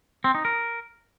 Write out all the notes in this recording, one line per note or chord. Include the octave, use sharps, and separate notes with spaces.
C4
D#4
A#4